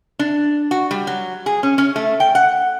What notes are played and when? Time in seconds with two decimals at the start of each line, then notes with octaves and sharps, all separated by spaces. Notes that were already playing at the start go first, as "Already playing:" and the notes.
0.19 D4
0.71 F#4
0.91 G3
1.07 F#3
1.46 G#4
1.63 C#4
1.78 C#4
1.96 A3
2.20 G5
2.35 F#5